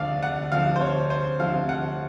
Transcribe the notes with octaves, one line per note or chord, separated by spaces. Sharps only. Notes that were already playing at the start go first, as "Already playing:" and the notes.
Already playing: D2 C3 F3 D5 F5
F#5
D2 C3 F3 F5
C5
C#5
C5
D2 C3 F3 F5
F#5